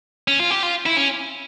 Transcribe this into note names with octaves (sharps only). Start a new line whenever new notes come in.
C#4
F4
G4
F4
E4
C#4